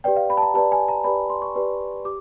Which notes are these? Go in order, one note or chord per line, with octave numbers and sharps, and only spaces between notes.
G4 B4 D5 G5
F5
B5
A5
A#5
G4 B4 D5 A5
G#5
A#5
G4 B4 D5 B5
C6
C#6
G4 B4 D5
G4 D6